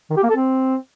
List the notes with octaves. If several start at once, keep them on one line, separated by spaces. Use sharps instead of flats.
D#3
G4
A#3
A4
C4